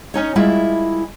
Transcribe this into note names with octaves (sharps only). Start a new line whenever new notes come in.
C#4 D#4 C#5
G3 G#3 E4 F4 A#4 E5